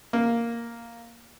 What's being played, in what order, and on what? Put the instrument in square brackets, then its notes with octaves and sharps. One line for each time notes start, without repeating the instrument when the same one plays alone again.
[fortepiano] A#3